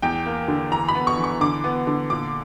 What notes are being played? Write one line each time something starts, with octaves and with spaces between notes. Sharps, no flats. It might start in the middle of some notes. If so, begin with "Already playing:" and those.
E2 G5
A#3
D3
E3 A#5
B5
B3
C#6
E3
C#6
D3 D6
B3
D3
A#2 D6